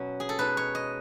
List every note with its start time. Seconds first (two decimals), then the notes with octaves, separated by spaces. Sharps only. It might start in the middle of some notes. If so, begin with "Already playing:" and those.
Already playing: B2 F#3 C#4
0.20 G#4
0.29 A4
0.39 B2 G#3 D#4 B4
0.57 C#5
0.75 D#5